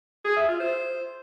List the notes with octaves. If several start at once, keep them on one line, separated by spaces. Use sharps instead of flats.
G#4
E5
F4
C5